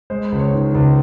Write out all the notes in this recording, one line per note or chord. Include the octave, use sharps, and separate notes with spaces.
G#3 C5
C#2
C#5
D#3
C#2